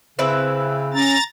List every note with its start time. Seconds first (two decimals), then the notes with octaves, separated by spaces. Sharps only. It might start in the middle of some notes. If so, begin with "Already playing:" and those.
0.19 C#3 C4 E4 B4
0.94 C#4 A#5 A6